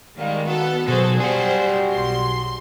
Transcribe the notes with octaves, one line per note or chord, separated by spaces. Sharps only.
D#3 G3 G#3 F5
B3 F#4 A4
B2 F#3 F#4 G#4 A4 C5
G3 F#4 G#4 C5
B1 C6